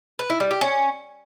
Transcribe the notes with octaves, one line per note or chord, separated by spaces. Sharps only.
B4
E4
G3
G4
C#4